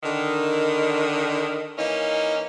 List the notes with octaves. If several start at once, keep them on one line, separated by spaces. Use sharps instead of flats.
D3 D#3
E3 A#3 C#4 D#4